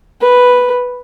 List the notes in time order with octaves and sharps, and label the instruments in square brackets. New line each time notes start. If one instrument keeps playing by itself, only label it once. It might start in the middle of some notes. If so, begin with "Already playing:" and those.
[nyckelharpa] B4